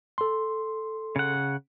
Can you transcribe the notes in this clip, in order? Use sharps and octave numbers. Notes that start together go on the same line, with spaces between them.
A4 C6
C#3 F#5